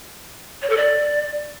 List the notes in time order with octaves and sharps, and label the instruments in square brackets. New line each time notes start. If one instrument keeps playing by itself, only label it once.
[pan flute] C#5
A4
D5